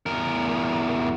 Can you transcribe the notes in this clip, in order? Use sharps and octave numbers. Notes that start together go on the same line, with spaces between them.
E2 A#4